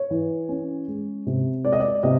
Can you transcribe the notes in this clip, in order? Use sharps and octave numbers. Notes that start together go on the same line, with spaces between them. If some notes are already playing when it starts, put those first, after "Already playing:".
Already playing: C#5
E3
C#4
G#3
C3
G#3 D5
D#5
D5
C3 D#5